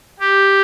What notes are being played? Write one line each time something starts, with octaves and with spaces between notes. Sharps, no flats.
G4